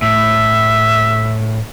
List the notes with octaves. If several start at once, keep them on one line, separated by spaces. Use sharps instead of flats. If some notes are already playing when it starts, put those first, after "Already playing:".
A2 E5